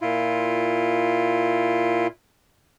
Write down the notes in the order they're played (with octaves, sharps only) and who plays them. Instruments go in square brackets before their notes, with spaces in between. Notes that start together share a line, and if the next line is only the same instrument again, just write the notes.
[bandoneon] A#2 E4 F4